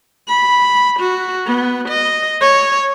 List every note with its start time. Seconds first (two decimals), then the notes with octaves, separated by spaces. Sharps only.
0.28 B5
0.99 F#4
1.46 B3
1.88 D#5
2.41 C#5